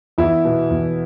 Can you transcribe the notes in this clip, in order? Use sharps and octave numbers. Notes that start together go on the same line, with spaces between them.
E2 E4
B2
E2